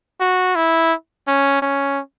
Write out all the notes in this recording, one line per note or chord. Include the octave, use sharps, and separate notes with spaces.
F#4
E4
C#4
C#4